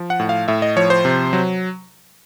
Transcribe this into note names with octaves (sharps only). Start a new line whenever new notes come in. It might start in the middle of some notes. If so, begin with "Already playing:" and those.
Already playing: F3
F#5
A2
F5
A2 E5
D#5
F3 C#5
C5
C3
F#3